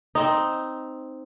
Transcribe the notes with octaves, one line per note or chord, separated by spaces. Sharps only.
C4 D#4